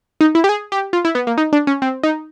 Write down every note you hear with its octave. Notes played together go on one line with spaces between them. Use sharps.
D#4
E4
G4
G#4
G4
F4
E4
B3
A#3
D#4
D4
C#4
C4
D#4